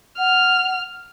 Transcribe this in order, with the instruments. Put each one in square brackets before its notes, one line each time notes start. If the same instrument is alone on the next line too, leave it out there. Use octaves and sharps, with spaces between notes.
[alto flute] F#5 [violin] F6